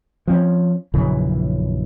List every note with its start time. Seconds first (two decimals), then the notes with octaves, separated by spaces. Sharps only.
0.27 F3 C4 C#4
0.94 A#1 F#2 C#3 E3